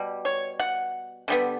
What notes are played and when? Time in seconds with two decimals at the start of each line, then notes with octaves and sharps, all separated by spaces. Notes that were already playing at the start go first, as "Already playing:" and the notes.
Already playing: B2 G3
0.25 C#5
0.60 F#5
1.28 D3 G3 B3